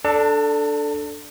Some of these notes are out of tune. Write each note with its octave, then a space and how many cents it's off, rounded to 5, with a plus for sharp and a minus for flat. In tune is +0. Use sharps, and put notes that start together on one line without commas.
D4 +0 A4 +0 A5 +35